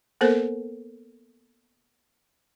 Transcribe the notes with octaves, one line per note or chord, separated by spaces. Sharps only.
A#3 B3 A4 A#4 C5